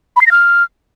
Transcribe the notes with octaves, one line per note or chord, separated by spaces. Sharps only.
B5
C7
A#6
F6